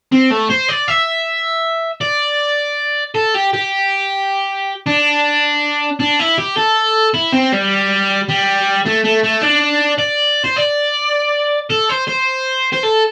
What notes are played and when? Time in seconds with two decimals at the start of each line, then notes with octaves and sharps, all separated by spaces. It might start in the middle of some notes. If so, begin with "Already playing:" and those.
0.12 C4
0.30 A3
0.50 C5
0.69 D5
0.88 E5
2.01 D5
3.15 A4
3.34 G4
3.53 G4
4.86 D4
6.00 D4
6.20 E4
6.38 G4
6.57 A4
7.14 E4
7.32 C4
7.52 G3
8.29 G3
8.86 A3
9.04 A3
9.23 A3
9.41 D4
9.98 D5
10.44 C5
10.56 D5
11.70 A4
11.89 C5
12.07 C5
12.73 C5
12.83 A4